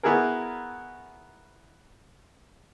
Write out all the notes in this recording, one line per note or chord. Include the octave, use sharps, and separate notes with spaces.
B3 E4 F#4 G#4 A#4